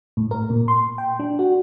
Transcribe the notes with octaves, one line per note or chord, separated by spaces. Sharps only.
A2
A#4
A#2
C6
G5
D4
F#4